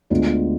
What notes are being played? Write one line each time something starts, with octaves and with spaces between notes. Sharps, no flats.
D2 D3 G#3 B3 F4